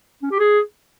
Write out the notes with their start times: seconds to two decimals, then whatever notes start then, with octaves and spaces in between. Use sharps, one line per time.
0.23 C#4
0.31 G4
0.39 G#4